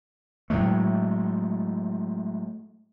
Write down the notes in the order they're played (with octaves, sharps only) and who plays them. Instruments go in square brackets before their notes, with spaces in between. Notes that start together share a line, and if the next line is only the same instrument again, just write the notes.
[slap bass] A2 F#3 G#3 A3